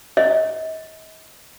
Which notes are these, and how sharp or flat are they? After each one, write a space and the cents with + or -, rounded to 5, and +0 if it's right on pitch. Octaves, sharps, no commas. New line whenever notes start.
D#5 +40